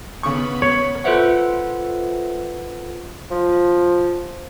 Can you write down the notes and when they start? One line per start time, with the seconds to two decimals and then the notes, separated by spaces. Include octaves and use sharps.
0.23 C#3 B3 B5 C#6
0.62 C#5
1.04 F4 A4 B4 C5 E5 F#5
3.31 F3